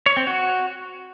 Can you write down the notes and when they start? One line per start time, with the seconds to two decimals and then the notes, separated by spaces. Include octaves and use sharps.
0.06 C#5
0.17 C4
0.27 F#4